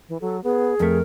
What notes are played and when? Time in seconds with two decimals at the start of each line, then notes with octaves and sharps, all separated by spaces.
0.09 E3
0.21 F#3 A4
0.44 B3 G#4
0.80 F2 A3 A#4